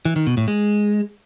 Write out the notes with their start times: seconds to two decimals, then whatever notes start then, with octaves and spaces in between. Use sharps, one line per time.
0.05 E3
0.16 D#3
0.27 B2
0.37 A2
0.48 G#3